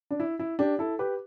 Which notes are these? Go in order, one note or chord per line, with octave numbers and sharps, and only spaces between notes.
D4
E4
E4
D4 G4
E4 A4
G4 B4